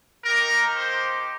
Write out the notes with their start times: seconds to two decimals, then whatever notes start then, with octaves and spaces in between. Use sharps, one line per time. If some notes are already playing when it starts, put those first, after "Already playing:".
0.24 A#3 D#4 G4 A#4
0.74 C5